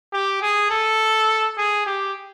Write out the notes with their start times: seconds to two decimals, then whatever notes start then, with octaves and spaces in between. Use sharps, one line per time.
0.13 G4
0.42 G#4
0.70 A4
1.58 G#4
1.86 G4